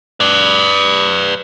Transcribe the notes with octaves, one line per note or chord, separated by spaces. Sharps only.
B4 D5